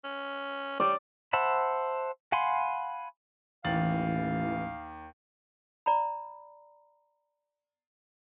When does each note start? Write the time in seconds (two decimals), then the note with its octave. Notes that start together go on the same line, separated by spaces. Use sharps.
0.04 C#4
0.80 G3 D5
1.33 C5 E5 F#5 A5 B5
2.32 F5 F#5 G#5 B5 C6
3.64 A1 D#2 E3 F5 A6 F#7
5.86 D5 A#5 B5